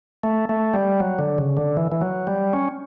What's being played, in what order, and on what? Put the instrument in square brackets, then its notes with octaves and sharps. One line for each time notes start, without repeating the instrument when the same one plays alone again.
[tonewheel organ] A3
A3
G3
F#3
D3
C#3
D3
E3
E3
F#3
G3
C#4